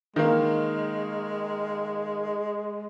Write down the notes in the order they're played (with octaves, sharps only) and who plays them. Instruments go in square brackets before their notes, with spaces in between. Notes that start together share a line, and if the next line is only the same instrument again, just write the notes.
[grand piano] D#3 A#3 [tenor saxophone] G#3